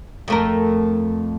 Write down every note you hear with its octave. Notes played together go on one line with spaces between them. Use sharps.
F2 A3 A#4